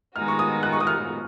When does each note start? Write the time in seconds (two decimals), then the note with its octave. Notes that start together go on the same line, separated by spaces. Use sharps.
0.15 D#3 G#3 B3 D#4 F#4 F6
0.28 C#6
0.39 D#6
0.63 F#6
0.73 C#6
0.80 D#6
0.87 F6